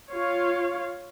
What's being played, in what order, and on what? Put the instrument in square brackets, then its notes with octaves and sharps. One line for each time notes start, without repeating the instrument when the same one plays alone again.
[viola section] F4 C#5 F5